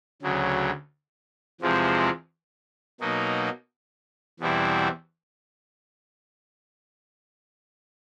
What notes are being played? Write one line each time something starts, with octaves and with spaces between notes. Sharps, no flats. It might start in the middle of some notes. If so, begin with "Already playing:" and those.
D2 C#3 F#3
E2 C3 F3 G#3 C4
B2 F#3 A#3 D#4
E2 B2 G3 C4 E4